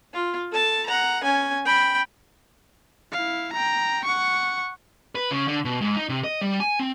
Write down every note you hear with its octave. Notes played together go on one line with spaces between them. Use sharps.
F4
A4 A5
F#5 A#5
C#4 G#5
G5 B5
E4 F5
G5 A#5
F#5 C#6
B4
C#3
D3
B2
G#2
D#4
C3
D#5
G3
G#5
C4